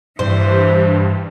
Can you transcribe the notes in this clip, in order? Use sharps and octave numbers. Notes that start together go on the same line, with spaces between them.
G2 E3 C5